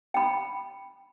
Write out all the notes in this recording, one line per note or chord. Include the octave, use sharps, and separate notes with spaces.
G5 B5